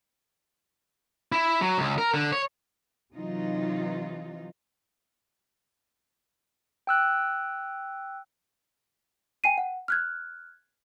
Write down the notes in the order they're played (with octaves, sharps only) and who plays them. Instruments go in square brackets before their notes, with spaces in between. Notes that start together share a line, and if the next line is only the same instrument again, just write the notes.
[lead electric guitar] E4
F#3
C#2
A#4
D3
C#5
[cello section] C3 E3 F#3 D#4 F4
[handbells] G5 E6 F#6
[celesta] G5 G#5 C7 D#7
F#5
F6 F#6 G#6